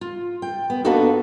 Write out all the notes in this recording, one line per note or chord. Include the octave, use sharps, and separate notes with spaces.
F4
G5
B3
A#3 B3 D4 D#4 F#4 A4